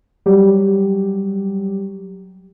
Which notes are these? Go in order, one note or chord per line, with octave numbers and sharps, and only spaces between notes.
F#3 G3 G4